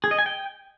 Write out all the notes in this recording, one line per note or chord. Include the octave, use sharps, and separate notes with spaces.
G#4
D#5
G#5
G5